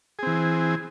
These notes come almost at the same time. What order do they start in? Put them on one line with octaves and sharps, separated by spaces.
G#4 C4 E3